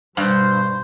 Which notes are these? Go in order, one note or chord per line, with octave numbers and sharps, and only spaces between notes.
G2 B2 G3 C5